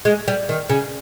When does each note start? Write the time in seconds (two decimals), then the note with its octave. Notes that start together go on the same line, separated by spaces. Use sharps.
0.05 G#3
0.28 G3
0.49 D#3
0.70 C#3